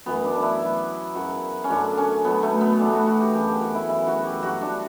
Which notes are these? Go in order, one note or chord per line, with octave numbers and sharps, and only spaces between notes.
F#2 E3 B3
D4
D4
E4
B2 F#3
F#2 C#3 F#3 F#4
C#4
F#2 D3 F#3 D4
C#4
B2 F#3 B3
A3
B3
A2 E3 D4
F#4
F#4
G4
F#2 C#3 E3 G4
G4
F#4
E4
F#2 C#3 E3 E4
F#4
G4
G2 F#3 F#4
D4